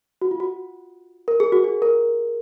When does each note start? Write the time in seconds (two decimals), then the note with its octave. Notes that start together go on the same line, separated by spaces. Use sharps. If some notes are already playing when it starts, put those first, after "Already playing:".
0.22 F#4
0.31 F4
0.40 F#4
1.28 A#4
1.40 G#4
1.52 F#4
1.64 G#4
1.82 A#4